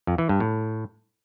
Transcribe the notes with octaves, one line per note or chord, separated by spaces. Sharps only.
F2
E3
G2
A2